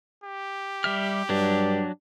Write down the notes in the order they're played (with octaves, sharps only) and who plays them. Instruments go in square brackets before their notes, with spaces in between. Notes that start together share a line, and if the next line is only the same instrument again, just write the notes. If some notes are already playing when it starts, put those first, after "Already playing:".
[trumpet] G4
[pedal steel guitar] G3 E5 F6
[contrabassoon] G2 [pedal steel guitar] F#3 D4